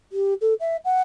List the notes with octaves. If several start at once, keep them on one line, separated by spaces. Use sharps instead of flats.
G4
A4
E5
F#5